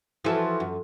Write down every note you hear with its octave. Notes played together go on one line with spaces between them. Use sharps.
E3 F3 E4 F#4 A4
F#2